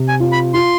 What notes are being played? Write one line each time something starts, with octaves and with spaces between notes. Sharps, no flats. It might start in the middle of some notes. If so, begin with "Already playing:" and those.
Already playing: C3
G#5
F4
B5
F4 C6